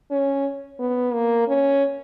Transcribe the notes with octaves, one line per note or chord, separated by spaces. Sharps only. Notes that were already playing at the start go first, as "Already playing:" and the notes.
C#4
B3
A#3
C#4